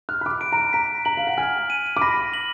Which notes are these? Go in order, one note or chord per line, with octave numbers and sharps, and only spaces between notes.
F6 F#6
B5
D6
B5 D7
A#5
B5
A#5 B6
A#5 F#7
F5
F#5
G#5 F6
D#7
D6
B5 A#6
F#7